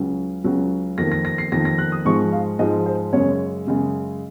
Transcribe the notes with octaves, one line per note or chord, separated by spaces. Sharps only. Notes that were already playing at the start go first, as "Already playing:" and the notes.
Already playing: C#2 C#3 F#3
C#2 C#3 F#3
F2 D#3 A#3 A#6
A#6
A#6
C7
F2 D#3 A#3 A#6
A#6
F#6
D#6
G#2 F3 G#3 C#6
F5
G#2 F3 G#3 D#5
C5
F#2 C#3 G#3 C#5
F#2 C#3 G#3